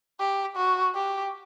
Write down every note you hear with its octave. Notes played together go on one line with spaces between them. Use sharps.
G4
F#4
G4